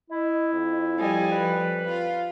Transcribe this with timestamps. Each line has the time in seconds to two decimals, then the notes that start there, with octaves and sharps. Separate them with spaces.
0.10 E4 D#5
0.53 F2
0.99 F3 G3 D#5 G#5
1.31 B4
1.85 F4 F5